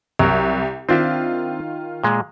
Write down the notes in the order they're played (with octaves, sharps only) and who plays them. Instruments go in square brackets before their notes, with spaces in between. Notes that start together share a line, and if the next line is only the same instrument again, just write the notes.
[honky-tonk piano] C2 [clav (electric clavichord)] F#3 A#4
[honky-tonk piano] D#3 F4 [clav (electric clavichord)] C4 D4 E5
[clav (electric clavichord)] A#2 G#3